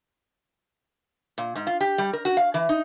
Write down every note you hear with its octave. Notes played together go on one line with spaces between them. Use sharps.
A#2
G#2
F4
G4
G3
A#4
F#4
F5
E3
D#4